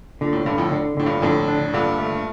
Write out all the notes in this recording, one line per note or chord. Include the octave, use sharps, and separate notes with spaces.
A#2 D3
A2
G2 D3
F2 A2
D3
A2 D3
G2 A#2
F2 A2 D3
D4
G2 A#2 D3
A3